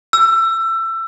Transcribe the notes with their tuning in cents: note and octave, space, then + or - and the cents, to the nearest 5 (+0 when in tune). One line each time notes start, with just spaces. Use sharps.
E6 +25